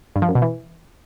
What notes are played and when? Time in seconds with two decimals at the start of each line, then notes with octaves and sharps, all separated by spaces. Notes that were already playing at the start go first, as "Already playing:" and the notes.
0.16 G2
0.22 F3
0.29 F#2
0.35 B2
0.42 E3